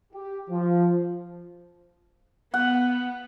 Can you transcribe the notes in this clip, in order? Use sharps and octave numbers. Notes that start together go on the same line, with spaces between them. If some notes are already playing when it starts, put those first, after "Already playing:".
G4
F3
B3 F#5